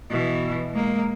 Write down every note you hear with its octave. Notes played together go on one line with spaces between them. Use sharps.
B2 E3
G#3 A#3